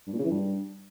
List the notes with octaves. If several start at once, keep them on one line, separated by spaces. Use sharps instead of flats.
G2
A#2
C#3
E3
G2